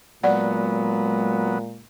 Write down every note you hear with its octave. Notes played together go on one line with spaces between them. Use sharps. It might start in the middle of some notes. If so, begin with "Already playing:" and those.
A#2 F#3 G#3 B3 D5 F#5